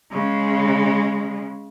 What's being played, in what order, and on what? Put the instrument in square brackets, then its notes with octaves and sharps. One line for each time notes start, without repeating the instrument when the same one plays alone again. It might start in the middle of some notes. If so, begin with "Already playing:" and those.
[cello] C#3 G#3